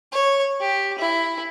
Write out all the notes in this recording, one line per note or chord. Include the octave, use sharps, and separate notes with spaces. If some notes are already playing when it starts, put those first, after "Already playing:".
C#5
G4
E4